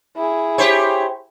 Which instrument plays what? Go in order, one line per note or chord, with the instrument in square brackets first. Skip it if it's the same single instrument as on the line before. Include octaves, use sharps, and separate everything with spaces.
[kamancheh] E4 G#4
[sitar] G4 C5 C#5